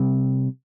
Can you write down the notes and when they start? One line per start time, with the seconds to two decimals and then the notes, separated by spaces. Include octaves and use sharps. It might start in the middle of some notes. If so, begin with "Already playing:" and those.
Already playing: C3 G3 C4